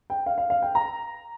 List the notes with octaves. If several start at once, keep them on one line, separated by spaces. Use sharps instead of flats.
G5
F5
F5
F5
G5
A#5